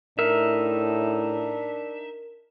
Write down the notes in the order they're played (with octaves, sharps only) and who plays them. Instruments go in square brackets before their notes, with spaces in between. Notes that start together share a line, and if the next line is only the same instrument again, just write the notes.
[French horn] A2 [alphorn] D4 [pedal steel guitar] D#4 E5 [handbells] A#4